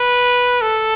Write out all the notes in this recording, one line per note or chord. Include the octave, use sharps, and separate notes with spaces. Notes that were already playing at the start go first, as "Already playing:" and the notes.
Already playing: B4
A4